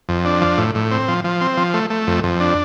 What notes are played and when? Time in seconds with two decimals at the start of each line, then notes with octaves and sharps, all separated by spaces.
0.09 F2
0.25 D4
0.41 F3
0.58 A2
0.75 A2
0.91 C4
1.08 F3
1.24 F3
1.41 C4
1.57 F3
1.74 A3
1.90 A3
2.07 F2
2.24 F2
2.40 D4